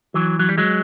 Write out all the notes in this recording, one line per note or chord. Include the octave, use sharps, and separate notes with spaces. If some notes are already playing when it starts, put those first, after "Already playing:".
E3 F#3
F#3
G3
F#3 G#3